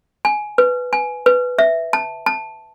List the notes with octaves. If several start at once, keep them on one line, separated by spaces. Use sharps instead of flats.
G#5
B4
G#5
B4
E5
A5
A5